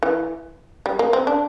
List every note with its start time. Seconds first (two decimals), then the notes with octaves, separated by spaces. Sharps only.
0.03 E3
0.86 G3
0.99 A#3
1.13 C4
1.27 D4